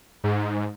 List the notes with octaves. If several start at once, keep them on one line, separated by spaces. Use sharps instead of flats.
G#2